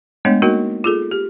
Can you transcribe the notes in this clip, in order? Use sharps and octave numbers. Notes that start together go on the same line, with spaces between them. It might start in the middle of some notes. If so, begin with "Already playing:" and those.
G#3 A3 B3 D4 C#5 D#5
A#3 D#4 F#4 A#4 D#5
F4 G#4 A4
G4